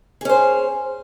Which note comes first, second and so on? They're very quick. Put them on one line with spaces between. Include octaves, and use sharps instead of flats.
G#4 C#4 C5